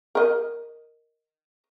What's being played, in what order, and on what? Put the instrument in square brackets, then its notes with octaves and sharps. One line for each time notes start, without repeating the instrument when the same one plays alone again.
[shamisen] A#4 D#5